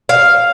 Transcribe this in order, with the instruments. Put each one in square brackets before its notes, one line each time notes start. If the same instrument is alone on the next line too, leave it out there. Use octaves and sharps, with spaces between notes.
[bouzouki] F5